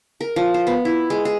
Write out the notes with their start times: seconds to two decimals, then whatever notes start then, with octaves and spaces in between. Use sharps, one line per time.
0.21 A#4
0.36 F3
0.54 C5
0.67 B3
0.85 E4
1.10 G#3
1.25 G#4